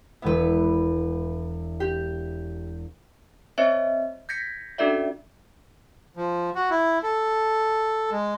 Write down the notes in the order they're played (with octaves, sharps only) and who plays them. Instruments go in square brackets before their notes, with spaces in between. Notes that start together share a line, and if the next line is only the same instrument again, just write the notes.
[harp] E1 E5 [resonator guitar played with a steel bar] B3 B4
[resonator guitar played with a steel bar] G4
[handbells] C4 C5 C#5 D#5 E5
G6 G#6 A#6 B6 C#7
C#4 D4 F#4 A4 D5 E5
[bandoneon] F3
F#4
E4
A4
G#3